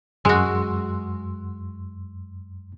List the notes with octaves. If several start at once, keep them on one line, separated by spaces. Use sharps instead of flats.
F#2 G#3 F#4 C6 E6